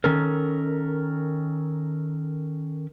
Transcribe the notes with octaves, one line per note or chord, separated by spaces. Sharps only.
D#3 C#4 A4 A#4